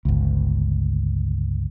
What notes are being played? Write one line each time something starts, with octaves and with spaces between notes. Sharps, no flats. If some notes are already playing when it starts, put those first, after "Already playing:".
G1 C#2